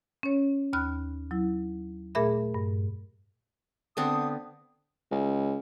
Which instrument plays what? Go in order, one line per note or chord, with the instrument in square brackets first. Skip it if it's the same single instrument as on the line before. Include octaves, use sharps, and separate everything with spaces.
[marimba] C#4 C#5
D#2 B5 F6 F#6
F#3 E4
A#2 A3 G#4 A#4 E5 B5
G2
[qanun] D3 B3 C4 [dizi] D#6
[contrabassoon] C#2